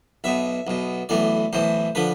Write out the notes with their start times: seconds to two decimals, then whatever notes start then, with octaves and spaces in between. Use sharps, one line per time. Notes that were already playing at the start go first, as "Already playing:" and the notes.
0.24 B1 B2 E5
0.67 B1 B2
1.09 B1 A2 E3 D5
1.53 B1 A2 E3 C5
1.95 D3 F3 B4